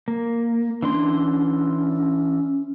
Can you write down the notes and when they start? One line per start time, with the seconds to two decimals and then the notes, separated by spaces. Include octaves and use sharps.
0.08 A#3
0.82 E3 C#4 D4 C6